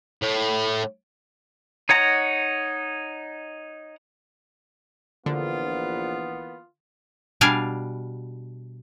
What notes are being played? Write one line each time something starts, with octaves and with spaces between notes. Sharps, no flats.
A2
D#4 C#5 F#5 A#5
A#1 D3 E3 A#3 B3 F4
B2 G3 D4 F5 G#5